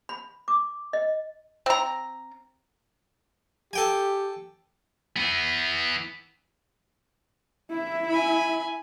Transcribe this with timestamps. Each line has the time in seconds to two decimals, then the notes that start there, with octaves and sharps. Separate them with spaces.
0.09 B5
0.48 D6
0.93 D#5
1.66 C4 A#5
3.73 G4 A4 G5 G#5
5.17 E3 B3
7.70 E4 E5
8.09 G#5 B5